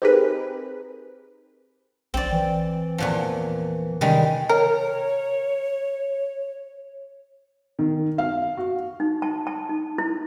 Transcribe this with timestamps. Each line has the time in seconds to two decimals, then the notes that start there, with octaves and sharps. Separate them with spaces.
0.02 C4 D#4 G4 G#4 A#4 B4
2.14 A#1 C4 D5
2.32 E3
2.98 E2 A#2 F3
4.01 C3 D#3 G3 G#3
4.49 A#4 C#5
7.79 D#3
8.18 F5
8.57 F#4
9.00 D#4
9.22 A5
9.47 A5
9.69 D#4
9.98 E4